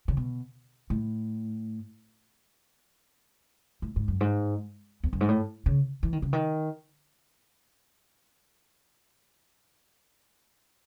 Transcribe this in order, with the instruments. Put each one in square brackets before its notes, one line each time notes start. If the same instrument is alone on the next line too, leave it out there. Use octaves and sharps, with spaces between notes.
[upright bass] C#3
B2
A2
A2
G#2
F#2
G#2
E2
F#2
G#2
A2
C#3
E3
D#3
C#3
D#3